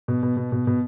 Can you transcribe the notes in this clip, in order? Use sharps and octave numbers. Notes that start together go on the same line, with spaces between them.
B2
B2
B2
B2
B2